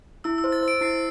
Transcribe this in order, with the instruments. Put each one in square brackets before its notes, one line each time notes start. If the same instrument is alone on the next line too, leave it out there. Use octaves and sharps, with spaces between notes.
[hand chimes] E4 [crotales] E6
[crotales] E6
[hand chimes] C5
[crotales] A6
[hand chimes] C5
[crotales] D7
[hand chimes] E4 [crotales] C7